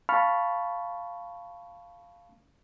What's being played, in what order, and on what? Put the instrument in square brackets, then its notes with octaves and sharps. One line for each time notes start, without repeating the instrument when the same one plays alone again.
[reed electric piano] F5 A5 B5 C#6 F6